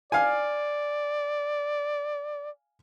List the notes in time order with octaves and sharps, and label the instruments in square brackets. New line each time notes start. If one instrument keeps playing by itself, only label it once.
[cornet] D5 [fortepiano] F5 G#5